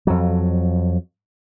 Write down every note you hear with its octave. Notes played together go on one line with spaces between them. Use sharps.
F2 F#3